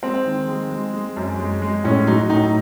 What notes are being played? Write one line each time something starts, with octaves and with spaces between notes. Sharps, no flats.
G#3 C4
D#3
G#3
G#3
G#3
F#2
G#3
G#3
A2 C#4
F#3 D#4
A2 D#4